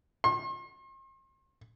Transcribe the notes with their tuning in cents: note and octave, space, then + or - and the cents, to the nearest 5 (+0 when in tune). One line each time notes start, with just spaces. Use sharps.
C6 +40